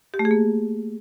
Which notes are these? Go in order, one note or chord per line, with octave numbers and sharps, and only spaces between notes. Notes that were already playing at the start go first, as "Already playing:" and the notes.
G4
A3
G#4
A#3